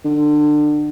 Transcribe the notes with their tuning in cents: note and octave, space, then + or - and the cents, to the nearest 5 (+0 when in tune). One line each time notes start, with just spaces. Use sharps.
D3 +25